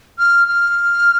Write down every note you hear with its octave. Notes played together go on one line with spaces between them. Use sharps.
F6
F6